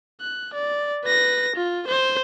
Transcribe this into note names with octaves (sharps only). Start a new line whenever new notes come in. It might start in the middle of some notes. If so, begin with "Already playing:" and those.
F#6
D5
B4 A#6
F4
C5